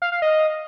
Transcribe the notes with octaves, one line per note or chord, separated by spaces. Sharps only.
F5
F5
D#5